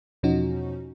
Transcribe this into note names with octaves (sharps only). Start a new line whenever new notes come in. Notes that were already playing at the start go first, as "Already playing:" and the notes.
E2 B2 F3 C#4 D#4 F#4